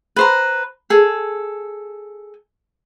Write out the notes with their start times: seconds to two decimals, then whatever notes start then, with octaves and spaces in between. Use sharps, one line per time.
0.16 B4 C5 A#5
0.90 G#4 A4